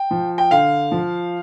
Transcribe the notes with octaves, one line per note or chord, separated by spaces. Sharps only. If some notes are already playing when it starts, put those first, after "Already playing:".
Already playing: G5
F3
G5
D3 F5
F3